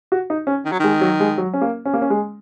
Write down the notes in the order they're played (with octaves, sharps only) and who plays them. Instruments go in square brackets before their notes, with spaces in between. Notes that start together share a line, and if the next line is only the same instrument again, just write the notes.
[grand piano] F#4
D#4
C#4
[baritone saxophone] D#3
F#3
[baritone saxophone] D#3 [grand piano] G#3
[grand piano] F#3
G#3
F#3
C#4
A#3
C#4
A#3
C#4
G#3